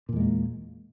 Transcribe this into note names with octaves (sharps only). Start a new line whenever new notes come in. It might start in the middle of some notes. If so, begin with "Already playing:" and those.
E2 A#2 G#3 A#3